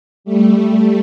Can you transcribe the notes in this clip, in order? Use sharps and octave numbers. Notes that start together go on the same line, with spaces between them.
G3 A3